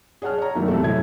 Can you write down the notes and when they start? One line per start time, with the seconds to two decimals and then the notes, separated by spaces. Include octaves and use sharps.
0.22 G#4 C#5 F#5 A5 F6
0.38 C#5 A#5
0.55 F#2 D#3 A3 A#3
0.68 C3 E3 A3 A4
0.81 D#1 F#2 A2 A3 E4 G#6